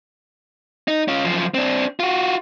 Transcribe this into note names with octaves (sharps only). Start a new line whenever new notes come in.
D#4
C#4 F4
F#2 F3
C4 D4
F4 F#4